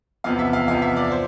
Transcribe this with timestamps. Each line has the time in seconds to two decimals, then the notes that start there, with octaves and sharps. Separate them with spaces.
0.24 E2 C3 F3 B3 F5
0.39 E5
0.53 F5
0.68 E2 C3 F3 B3 F5
0.82 E5
0.97 D5
1.12 C5